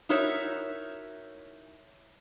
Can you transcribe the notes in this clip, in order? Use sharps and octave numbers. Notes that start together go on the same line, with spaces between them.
D#4 E4 F#4 A#4 C#5 E5